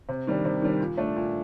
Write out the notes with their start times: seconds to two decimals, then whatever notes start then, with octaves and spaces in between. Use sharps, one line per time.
0.09 C3
0.27 D#3 G3 D4
0.45 C3
0.62 D#3 G3 D4
0.81 A#2
0.97 A3 D4
1.16 A#2